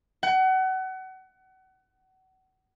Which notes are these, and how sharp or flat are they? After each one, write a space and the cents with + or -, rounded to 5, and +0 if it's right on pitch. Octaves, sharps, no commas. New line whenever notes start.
F#5 +30